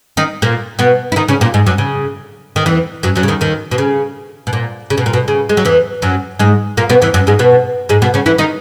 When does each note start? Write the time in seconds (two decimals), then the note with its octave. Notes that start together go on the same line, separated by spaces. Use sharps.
0.17 D#3 D#4
0.42 A#2 A#3
0.79 B2 B3
1.12 E4
1.16 D#3 D#4
1.28 C#3 C#4
1.41 A#2 A#3
1.54 G#2 G#3
1.66 F#2 F#3
1.78 C#3
2.56 D#3
2.66 E2 E3
3.03 F#2 F#3
3.16 F#2 F#3
3.23 C#3
3.28 D#2 D#3
3.41 D#2 D#3
3.71 B2
3.78 C#3
4.47 B2
4.53 A#2
4.90 C#3
4.98 B2
5.06 A#2
5.13 B2
5.28 C#3
5.49 G#3
5.57 F#3
5.65 E2 E3
6.02 F#2 F#3
6.39 G#2 G#3
6.77 A#2 A#3
6.89 B2 B3
7.02 E2 E3
7.14 F#2 F#3
7.27 G#2 G#3
7.39 B2 B3
7.89 G#2 G#3
8.02 B2 B3
8.14 C#3 C#4
8.26 E3 E4
8.38 D#3 D#4